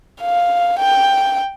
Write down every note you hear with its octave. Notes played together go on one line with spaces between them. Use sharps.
F5
G5